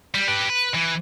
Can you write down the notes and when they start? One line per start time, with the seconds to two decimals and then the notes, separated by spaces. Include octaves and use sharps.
0.14 G3
0.28 G4 B4
0.49 B4
0.74 E3